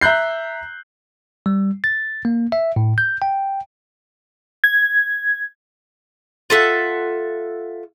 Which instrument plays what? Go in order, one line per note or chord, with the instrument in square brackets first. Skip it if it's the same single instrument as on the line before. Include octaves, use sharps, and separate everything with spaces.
[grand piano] E5 A#5 F#6 G6 C7
[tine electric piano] G3
A6
A#3
E5
A2
G6
G5
[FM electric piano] G#6
[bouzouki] F4 A4 E5 F#5